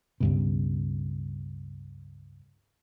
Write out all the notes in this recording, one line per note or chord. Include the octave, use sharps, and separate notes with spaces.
C#2 G2 B2